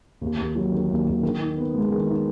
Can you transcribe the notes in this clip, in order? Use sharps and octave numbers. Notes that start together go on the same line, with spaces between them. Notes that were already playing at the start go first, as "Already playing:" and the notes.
D#2
D#2
F#3
D#3
D#2
D#2
D#3
D#4
B3
G#3
D#3
D#4